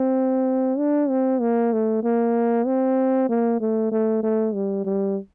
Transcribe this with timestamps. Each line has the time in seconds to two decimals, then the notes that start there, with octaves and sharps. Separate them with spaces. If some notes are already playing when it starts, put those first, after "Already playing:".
Already playing: C4
0.78 D4
1.09 C4
1.41 A#3
1.73 A3
2.03 A#3
2.66 C4
3.29 A#3
3.60 A3
3.91 A3
4.23 A3
4.54 G3
4.85 G3